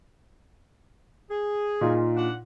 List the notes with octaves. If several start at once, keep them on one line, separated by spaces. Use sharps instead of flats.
G#4
A#2 D#4 F4
D4 F#5